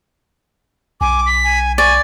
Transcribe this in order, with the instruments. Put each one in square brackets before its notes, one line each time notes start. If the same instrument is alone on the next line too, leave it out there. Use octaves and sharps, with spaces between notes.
[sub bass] B1 [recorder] G#5 [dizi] D6
[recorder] B6
[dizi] G#5
[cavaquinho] D5 [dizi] G#5 [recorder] C#6